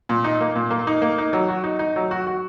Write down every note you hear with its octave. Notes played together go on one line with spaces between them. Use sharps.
A#2
D#4
A#3
A#2
A#3
D#4
A#3
D#4
F#3
F#4
D#4
D#4
F#3
F#4
F#4